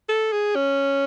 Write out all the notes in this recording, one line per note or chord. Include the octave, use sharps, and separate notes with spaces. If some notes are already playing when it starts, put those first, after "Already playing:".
A4
G#4
C#4